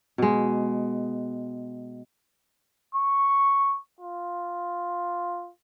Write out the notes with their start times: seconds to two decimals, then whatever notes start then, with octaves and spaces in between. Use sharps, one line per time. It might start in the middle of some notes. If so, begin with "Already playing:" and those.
0.18 B2 G#3
2.95 C#6
4.00 F4